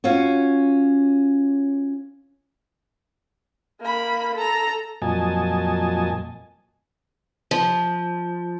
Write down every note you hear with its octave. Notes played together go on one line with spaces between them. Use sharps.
C#4 F4 F#4 C#5
A#3 B5
A4 A#5
F2 A#2 F#3 D#5 G#5 A5
F3